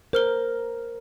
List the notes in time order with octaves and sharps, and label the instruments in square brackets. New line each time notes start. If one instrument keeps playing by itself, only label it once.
[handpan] A#4 [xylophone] C5 F6 G7